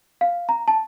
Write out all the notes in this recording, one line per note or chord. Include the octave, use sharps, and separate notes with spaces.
F5
A#5
A5